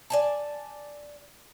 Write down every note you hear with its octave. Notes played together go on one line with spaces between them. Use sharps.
D5 G#5 A5